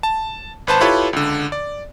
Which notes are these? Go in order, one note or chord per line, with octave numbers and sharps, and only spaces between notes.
A5
G#1 B4 C5 A5
E4 F4 G4 A4 B4 C#5
C#2 D3
D5